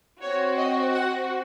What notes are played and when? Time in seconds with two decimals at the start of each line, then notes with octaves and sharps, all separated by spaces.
0.21 C4 F#4 C#5
0.57 D#5
0.93 F#5